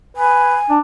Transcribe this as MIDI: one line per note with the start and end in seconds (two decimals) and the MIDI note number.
0.17 0.57 71
0.17 0.72 80
0.70 0.79 62